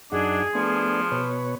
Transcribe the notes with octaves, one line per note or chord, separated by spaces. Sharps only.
F#2 D4 D#4 G#4 F#5
F3 A3 B3 D4
B2 B4 C#5